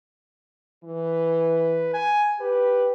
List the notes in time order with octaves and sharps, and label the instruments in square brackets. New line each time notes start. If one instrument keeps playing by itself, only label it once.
[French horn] E3 [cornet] B4
[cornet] G#5
[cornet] G4 [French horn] B4